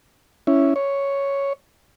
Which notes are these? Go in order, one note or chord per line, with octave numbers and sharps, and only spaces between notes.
C#4 E4
C#5